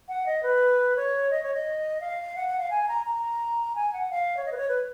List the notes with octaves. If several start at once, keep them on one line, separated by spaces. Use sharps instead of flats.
F#5
D#5
B4
C#5
D#5
C#5
D#5
F5
F#5
F#5
F5
G#5
A#5
A#5
G#5
F#5
F5
C#5
D#5
B4
C#5
B4